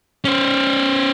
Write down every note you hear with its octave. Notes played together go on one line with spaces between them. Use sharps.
C#4 C5